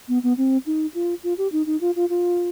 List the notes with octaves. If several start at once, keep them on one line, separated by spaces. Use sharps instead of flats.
B3
B3
C4
D#4
F4
F4
G4
D#4
D#4
F4
F4
F4